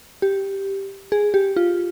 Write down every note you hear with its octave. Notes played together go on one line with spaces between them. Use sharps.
G4
G#4
G4
F4